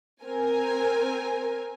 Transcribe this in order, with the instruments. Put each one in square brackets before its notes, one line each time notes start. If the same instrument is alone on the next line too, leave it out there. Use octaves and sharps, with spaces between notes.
[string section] C4 A#4 G#5